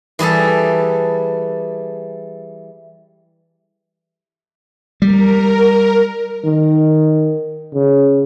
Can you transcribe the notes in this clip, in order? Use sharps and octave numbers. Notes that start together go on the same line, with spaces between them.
E3 G3 G#4 A4
G3 A#4
D#3
C#3